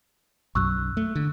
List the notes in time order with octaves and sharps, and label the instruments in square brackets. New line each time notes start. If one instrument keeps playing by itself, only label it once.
[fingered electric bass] B1 F#2 [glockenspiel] C#6 E6 F#6
[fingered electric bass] A3
D3